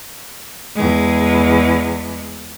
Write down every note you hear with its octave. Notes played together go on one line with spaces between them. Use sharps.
E2 G#3